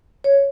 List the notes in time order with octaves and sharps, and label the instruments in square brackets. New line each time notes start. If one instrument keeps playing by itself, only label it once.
[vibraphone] C#5